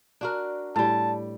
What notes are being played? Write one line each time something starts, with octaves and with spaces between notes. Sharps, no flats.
D4 F#4 A#4
A2 G3 A5